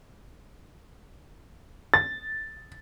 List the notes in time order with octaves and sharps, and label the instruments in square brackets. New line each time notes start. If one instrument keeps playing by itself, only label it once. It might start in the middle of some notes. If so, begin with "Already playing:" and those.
[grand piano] A6